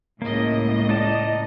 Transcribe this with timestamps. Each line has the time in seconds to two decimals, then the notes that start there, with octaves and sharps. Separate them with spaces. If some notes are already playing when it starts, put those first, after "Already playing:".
0.22 C#2 A2 A#3 D#5
0.89 D#4 D5 A5